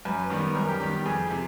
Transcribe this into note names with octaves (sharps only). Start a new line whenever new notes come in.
F#2 B4
D#3 G3 B3
F#2 A#4
G4
D#3 G3 B3 G4
G4
F2 G#4
C3 F3